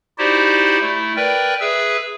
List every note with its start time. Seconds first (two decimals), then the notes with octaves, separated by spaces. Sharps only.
0.18 D#4 E4 F#4 G4 C5 D5
0.81 A3 E4
1.16 A#4 B4 D5 G5
1.60 G#4 B4 E5 E6